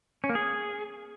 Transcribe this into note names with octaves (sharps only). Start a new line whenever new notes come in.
C#4
A#3
G#4